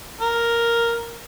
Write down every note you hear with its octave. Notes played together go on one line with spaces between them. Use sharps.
A#4